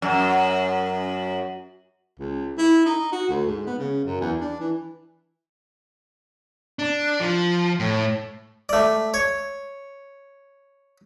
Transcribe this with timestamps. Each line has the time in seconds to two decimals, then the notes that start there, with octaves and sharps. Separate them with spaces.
0.02 F#2
2.19 C#2
2.58 E4
2.86 D#4
3.12 F#4
3.29 D2
3.46 G#2
3.67 B3
3.79 C#3
4.05 F#2
4.21 E2
4.41 D4
4.60 E3
6.79 D4
7.20 F3
7.80 A2
8.69 A3 D5
9.14 C#5